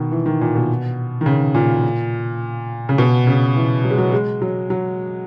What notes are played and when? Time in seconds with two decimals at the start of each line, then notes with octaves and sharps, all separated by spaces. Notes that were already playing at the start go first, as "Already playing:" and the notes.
Already playing: B2 D#3
0.12 E3
0.26 D#3
0.41 A#2
0.55 B2
1.21 D#3
1.26 C#3
1.54 A#2
2.89 C#3
2.98 B2
3.27 C#3
3.56 E3
3.84 F#3
3.91 G#3
3.98 F#3
4.12 G#3
4.42 F#3
4.70 F#3